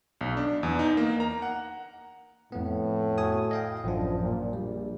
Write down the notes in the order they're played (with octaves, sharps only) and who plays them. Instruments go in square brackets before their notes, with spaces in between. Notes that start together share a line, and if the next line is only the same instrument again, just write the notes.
[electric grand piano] B1
D4
E2
D#4
A#3
A#5
F#5
[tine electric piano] F2 B3 [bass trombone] A2
[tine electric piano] F#4 G#5 D#6
D#5 F5 G5
[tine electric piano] A1 F#2 D4 [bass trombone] F3
[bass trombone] A#2
[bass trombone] A#1 [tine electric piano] G3